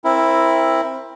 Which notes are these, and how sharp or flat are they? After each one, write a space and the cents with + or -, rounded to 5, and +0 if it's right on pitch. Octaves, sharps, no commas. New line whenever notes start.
C4 +20 E4 +0 A#4 +0